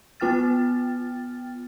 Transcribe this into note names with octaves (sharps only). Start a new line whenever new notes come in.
B3 F4 G5 F6 A6